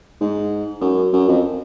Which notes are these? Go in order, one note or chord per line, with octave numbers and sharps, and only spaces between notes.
G#2
F#2
F#2
F2